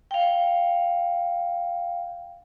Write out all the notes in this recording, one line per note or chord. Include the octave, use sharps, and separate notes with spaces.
F5 G5